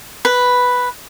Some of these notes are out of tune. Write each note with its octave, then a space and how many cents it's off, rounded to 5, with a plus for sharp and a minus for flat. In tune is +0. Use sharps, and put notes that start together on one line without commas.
B4 +0